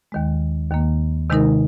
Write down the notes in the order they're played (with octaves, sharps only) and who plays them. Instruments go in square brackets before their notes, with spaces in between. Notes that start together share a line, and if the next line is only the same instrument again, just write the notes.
[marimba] D#2 D#3 G#3
D#2 D#3 A#3
C3 D#3 G#3 D#4 A#4